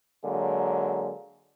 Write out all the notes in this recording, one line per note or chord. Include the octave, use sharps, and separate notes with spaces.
D3 F#3 G#3 A#3